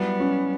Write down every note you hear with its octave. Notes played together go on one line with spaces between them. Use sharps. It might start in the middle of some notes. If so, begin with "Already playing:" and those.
Already playing: F#3 G3 B3 E4
C#4